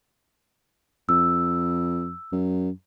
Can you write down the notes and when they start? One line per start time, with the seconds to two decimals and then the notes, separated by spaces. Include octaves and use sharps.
1.09 F2 E6
2.32 F#2